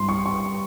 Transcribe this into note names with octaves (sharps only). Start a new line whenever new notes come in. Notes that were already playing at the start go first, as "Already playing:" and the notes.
Already playing: G2 G3 C4 E4 C6
C#6
C#6